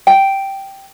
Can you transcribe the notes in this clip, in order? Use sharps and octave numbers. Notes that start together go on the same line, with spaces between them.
G5